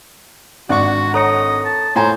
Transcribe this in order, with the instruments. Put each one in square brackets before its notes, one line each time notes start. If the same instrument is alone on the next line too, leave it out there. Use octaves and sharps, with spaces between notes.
[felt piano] G#1 D4 F#5 [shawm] F#4 [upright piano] D5 C#6
[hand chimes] A4 C#5 C#7 [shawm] D#5 [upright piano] A#5
[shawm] A5
[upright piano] A2 [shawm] C5 [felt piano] C#5 G#5 A#5